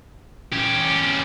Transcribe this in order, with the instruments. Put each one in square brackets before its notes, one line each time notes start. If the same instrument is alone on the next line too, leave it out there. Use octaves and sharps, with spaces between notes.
[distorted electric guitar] C#4 G4